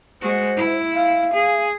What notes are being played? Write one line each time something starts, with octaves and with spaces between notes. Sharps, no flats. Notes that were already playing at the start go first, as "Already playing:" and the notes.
G#3 F#4 C5
E4
F5
G#4